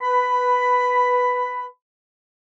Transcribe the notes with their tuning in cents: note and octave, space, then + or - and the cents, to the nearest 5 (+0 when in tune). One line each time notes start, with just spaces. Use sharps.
B4 +0 B5 +10